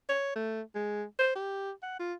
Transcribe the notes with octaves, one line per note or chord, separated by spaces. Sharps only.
C#5
A3
G#3
C5
G4
F#5
F4